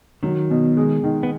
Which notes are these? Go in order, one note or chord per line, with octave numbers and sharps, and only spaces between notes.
D#3 F#3
B2
G#3
D#3
B3